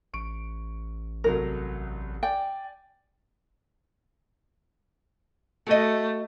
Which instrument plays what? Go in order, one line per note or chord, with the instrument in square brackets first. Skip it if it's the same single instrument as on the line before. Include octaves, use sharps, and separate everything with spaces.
[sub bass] A1 [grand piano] C#6 D7
[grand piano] C2 F#3 A3 [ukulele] A#4
[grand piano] D5 G#5 [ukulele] G5
[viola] A3 [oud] F#4 D#5